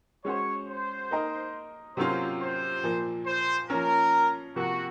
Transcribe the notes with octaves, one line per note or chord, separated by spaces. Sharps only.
G#3 C#4 F#4 C5 C#5
C5
A#3 D#4 A#4 D#5
C3 F#3 A#3 C#4 F4 C5
C5
A#2 F3 A#3
C5
F3 A#3 C#4 A#4
C3 F3 A#3 F#4